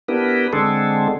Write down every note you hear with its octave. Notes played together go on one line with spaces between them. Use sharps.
B3 D4 E4 G4 A#4 B4
D3 G#3 C4 D4 G#4 A4